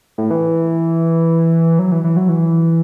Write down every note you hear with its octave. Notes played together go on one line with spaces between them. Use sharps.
A2
E3
F#3
E3
E3
F#3
E3